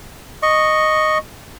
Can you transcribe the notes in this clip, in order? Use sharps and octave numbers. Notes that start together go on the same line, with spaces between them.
D#5 C#6